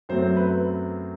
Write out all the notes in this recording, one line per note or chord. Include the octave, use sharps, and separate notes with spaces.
F#2 F#3 A3 C4 C5
B4